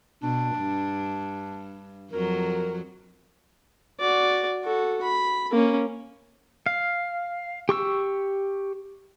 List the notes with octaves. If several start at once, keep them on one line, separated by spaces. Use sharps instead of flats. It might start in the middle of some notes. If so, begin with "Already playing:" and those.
B2 D4
G2
F2 F#3 A#4
F#4 D5
F#4 A4
B5
A#3 C#4
F5
G4 C#6 E6